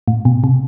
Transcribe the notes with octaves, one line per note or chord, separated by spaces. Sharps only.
A2
B2
C3